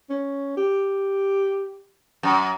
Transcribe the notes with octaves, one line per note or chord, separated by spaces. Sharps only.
C#4
G4
F#2